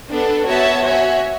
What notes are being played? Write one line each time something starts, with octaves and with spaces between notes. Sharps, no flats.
B3 D4 A4
B3 F#4 C#5 E5 A5
F#4 C#5 E5 G#5